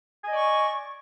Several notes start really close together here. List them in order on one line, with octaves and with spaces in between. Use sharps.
G#5 D#5 D5 C#6